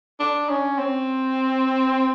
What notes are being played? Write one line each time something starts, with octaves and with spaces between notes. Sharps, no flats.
D4
C#4
C4